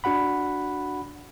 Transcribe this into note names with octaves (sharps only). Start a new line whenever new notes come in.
D4 F#4 F#5 B5